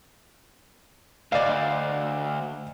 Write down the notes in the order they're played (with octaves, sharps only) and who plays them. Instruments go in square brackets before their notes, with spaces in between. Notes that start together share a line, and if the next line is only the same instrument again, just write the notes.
[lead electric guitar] D2 [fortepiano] D5 D#5 F5